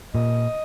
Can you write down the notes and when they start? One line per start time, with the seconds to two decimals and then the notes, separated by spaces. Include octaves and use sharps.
0.14 A#2 D#5